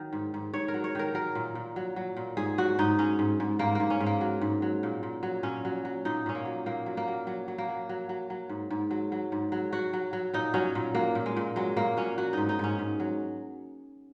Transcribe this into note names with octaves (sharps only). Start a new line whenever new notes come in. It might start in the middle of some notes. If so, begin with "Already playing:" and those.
Already playing: D#3 F#3
G#2
G#2
G#2 C#5
A#4
F#3
C#5
D#3 A#4
F#3 A#4
A#2
A#2
F#3
F#3
A#2
G#2 G#4
F#3 F#4
G#2 D#4
F#3 C#4
G#2
G#2
G#2 A#3
G#2 A#3
C#4
G#2
A#3
F#3
G#2
F#3
A#2
A#2
F#3
A#2 C#4
F#3
F#3
A#2 D#4
A#2 C#4
A#3
F#3
A#2 A#3
F#3
A#3
F#3
F#3
F#3
A#3
F#3
F#3
F#3
F#3
G#2
G#2
F#3
F#3
G#2
F#3
F#3 F#4
F#3
F#3
A#2 D#4
F#3 C#4
A#2
F#3 A#3
A#2
G#3
A#2
F#3 G#3
A#2 A#3
F#3 C#4
F#3 F#4
G#2 D#4
D#4
G#2 C#4
G#2
F#3